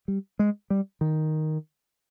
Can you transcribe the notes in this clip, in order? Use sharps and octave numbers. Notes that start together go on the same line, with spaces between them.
G3
G#3
G3
D#3